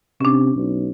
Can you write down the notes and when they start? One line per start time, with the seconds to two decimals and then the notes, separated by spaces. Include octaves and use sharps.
0.21 C3 C#4 D4
0.56 B1